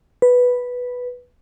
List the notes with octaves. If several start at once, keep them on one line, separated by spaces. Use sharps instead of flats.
B4